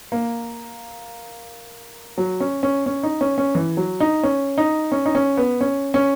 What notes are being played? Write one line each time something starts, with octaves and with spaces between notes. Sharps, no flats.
A#3
F#3
C#4
C#4
C#4
D#4
C#4
C#4
E3
F#3
D#4
C#4
D#4
C#4
D#4
C#4
B3
C#4
C#4